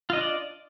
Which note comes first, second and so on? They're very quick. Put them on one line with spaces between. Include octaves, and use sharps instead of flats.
F4 D#5 D4 D5